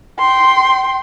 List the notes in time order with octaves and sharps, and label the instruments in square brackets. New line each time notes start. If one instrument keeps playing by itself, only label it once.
[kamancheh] G5 C6